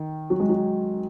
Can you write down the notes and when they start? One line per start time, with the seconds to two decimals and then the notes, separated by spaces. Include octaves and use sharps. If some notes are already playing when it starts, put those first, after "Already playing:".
Already playing: D#3
0.30 F#3
0.40 G#3
0.49 F#3